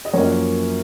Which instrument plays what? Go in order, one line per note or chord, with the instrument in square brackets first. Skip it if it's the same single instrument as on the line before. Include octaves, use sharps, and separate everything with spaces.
[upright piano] D#5
[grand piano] F#2 F3 A#3 C#4 F#4 [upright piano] C#5